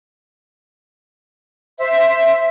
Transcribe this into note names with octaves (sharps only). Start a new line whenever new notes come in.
C5 E5